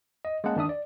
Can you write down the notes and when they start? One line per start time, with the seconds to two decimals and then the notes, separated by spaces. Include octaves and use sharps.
0.25 D#5
0.44 G#3 A#3 C#4 F#5 A5
0.56 D#3 D4 E5 D#6
0.69 D5